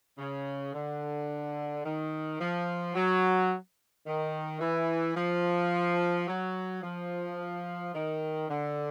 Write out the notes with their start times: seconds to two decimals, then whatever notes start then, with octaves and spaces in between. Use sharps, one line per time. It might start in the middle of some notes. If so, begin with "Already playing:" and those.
0.18 C#3
0.74 D3
1.85 D#3
2.40 F3
2.95 F#3
4.06 D#3
4.61 E3
5.16 F3
6.28 F#3
6.82 F3
7.94 D#3
8.49 D3